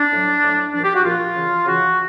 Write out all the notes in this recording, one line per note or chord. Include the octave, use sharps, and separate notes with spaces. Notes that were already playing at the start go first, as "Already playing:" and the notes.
Already playing: D4
A2 F#3
A2 F#3
A#2 F3 D4
G4
F#4
A#2 F3 F4
C#3 E3
C#3 E3 F#4